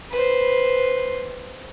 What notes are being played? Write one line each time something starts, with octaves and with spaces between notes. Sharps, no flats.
B4 C5